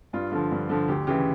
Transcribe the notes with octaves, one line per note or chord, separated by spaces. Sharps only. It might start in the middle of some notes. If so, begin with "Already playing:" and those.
G2 F4
D3 F3
G2
D3 F3
D2 G4
C#3 E3 G4